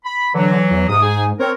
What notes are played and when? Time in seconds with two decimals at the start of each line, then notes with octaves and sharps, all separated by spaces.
0.04 B5
0.34 D3 E3 F#3
0.70 E2
0.89 G#2 C3 D#6
1.02 D#4 G#4 G#5
1.39 C4 A#4 C#5